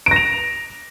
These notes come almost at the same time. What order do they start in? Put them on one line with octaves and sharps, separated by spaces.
D7 A#6 F7